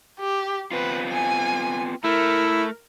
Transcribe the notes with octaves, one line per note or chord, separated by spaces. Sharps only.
G4
B3 C4 F4 B4
G#5
A3 E4 A#4